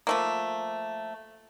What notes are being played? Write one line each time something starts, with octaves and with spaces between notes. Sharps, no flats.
F3 A3 A#3